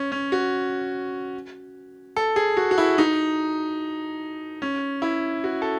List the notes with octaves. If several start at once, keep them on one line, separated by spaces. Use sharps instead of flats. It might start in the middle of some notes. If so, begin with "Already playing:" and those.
Already playing: C#4
C#4
F#4
A4
G#4
F#4
F#4
E4
D#4
C#4
E4
F#4
A4